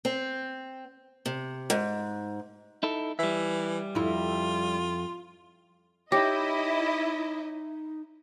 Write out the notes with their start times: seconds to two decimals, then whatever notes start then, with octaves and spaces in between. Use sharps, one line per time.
0.05 C4
1.26 C3
1.70 G#2
2.83 D#4 E4 A4
3.19 E3 G3 E5
3.95 F2 E4 F4
6.12 D#4 E4 G4 C#5 D#5 D6 A#6